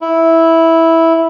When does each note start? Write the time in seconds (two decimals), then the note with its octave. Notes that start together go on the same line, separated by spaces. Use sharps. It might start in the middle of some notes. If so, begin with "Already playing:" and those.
0.01 E4